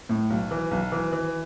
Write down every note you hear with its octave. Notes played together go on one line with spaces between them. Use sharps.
A2
B1
E3
B1
E3
E3